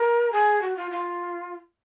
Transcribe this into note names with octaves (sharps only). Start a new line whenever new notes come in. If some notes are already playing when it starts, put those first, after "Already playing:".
Already playing: A#4
G#4
F#4
F4
F4